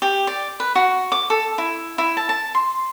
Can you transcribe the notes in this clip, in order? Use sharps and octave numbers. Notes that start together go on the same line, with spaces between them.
G4
D5
B4
F#4
D6
A4
E4
E4
A5
A5
C6